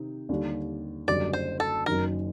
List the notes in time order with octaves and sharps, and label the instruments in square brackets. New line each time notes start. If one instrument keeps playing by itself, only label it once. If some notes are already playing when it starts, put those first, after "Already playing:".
Already playing: [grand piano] C3 D#3 C4 D#4
D#2 D3 G3
[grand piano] F#1 F#2 D3 G3 [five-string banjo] D5
[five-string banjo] C5
A4
[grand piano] F#1 F#2 D#3 [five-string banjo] A#4